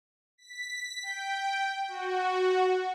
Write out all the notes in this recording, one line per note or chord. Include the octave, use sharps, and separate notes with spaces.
B6
G5
F#4